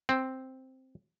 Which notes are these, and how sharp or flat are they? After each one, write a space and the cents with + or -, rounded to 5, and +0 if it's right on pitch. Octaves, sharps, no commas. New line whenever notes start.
C4 +0